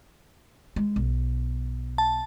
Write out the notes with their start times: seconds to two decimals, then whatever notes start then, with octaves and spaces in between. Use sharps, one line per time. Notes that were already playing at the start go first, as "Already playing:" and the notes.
0.76 G#3
0.96 B1
1.98 A5